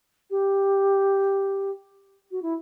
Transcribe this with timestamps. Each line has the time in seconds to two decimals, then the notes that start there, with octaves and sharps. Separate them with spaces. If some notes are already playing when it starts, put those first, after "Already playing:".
0.30 G4
2.31 F#4
2.42 E4